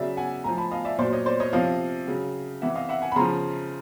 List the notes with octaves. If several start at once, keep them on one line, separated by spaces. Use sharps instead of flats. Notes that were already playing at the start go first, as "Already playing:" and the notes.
Already playing: C#3 F#3 D5 E5
F#5 G#5
A2 F3 G#5 A#5
A5 B5
D#5 F5
D5 E5
A#2 F#3 C5 D5
C#5 D#5
C5 D5
C#5 D#5
C3 F3 D#5 F5
C#3 F#3
C3 E3 E5 F#5
D#5 F5
E5 F#5
F#5 G#5
B5
C#3 F3 A#5 C6